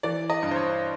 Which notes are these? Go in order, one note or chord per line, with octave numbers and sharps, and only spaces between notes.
E3 D5
D#5
G2
C5
C#5